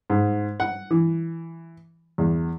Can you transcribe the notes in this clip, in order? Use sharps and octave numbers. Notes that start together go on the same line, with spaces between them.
G#2
F#5
E3
E2